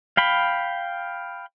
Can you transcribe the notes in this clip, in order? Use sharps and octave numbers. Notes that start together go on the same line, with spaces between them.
F5 G5 B5